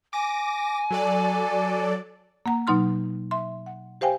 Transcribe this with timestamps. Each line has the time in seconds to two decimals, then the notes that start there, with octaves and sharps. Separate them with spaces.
0.13 G#5 D6 A#6
0.91 F#3 A4 D5
2.46 A#3 F#5 A#5
2.67 B2 F#3 D#4 C6 F6
3.31 E5 C6
3.66 F#5
4.01 G4 C5 F5 G5 G#5